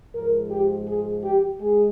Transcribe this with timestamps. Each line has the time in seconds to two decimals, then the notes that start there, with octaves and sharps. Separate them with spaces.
0.13 G#2 F3 G#3 A#4
0.50 G4
0.87 G#4
1.23 G4
1.59 G#3 G#4